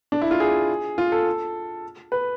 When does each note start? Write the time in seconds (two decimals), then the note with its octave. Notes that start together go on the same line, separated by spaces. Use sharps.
0.12 D4
0.21 E4
0.31 F4
0.40 G#4
0.98 F4
1.12 A4
2.12 B4